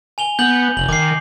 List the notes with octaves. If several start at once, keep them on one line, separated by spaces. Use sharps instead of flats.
G#5 F7 G7
B3 G6 F#7
F1 F#7
D#3 D6 C7